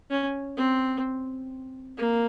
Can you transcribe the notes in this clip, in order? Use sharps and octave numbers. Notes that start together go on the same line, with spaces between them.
C#4
C4
A#3